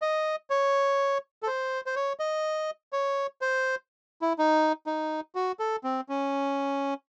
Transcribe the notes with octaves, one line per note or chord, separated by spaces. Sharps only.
D#5
C#5
A4
C5
C5
C#5
D#5
C#5
C5
E4
D#4
D#4
F#4
A4
C4
C#4